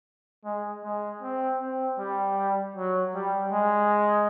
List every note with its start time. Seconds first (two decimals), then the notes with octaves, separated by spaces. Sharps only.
0.45 G#3
0.84 G#3
1.22 C4
1.61 C4
1.99 G3
2.76 F#3
3.15 G3
3.52 G#3